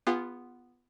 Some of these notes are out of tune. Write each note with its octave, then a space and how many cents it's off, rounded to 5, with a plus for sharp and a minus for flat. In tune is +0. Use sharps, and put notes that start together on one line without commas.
B3 +0 F4 -10 G#4 -45